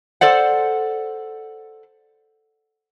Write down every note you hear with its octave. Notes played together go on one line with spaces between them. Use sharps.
A4 C5 D5 F#5